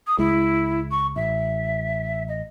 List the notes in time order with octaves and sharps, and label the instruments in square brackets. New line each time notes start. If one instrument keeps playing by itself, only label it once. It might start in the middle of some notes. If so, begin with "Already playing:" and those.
[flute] D#6
[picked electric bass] C#2 G#3 [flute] E4
[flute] C#6
[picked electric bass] A1 [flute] E5
[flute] D#5